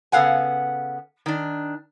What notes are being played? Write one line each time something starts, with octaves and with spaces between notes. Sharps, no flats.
C#3 B3 A4 F5 F#5 G#5
D#3 D4